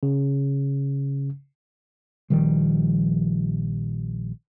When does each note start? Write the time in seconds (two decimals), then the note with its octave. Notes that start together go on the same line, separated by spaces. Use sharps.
0.03 C#3
2.30 A#1 D#3 F3 G3